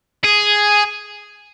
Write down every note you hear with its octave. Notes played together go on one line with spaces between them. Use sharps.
G#4